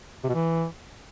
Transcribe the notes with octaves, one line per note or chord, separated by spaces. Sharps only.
C3
B2
E3